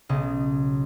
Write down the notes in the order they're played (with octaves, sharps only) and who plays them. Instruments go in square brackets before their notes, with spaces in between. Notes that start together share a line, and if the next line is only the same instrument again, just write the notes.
[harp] B1 C#3 D#5